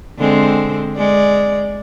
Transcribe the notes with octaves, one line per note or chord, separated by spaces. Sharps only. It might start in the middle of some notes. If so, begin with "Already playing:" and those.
D3 G#3 C4
G#3 D5